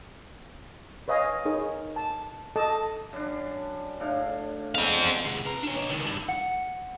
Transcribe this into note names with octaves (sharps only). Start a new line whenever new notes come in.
B4 C#5 D#5 F5 G#5
D#4 G#4 A#4 C#5
A5
A4 D#5 A5 D6
F#2 D4
A2 D4 F5
B2 G#3 C4 F5
C3 G#3
B4 A#5
D4 C#5
B4 C#5
C#2 D#3
G2
F#5